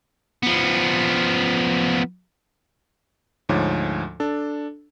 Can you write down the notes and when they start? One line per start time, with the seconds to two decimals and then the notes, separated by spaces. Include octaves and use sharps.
0.43 F3 B3
3.49 D2 G#2 F3 C#5
4.20 D4 A4